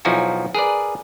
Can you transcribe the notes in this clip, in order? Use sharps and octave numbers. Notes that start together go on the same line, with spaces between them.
B1 F3 D#4 E4 F#4 G#5
G#4 A#4 B4 D5